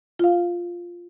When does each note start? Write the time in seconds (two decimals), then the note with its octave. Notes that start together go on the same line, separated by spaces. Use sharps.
0.19 F4 F5